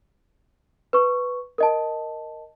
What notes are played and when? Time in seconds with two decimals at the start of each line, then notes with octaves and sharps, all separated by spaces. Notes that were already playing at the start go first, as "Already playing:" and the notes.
0.93 B4 C#6
1.58 A#4 D#5 A5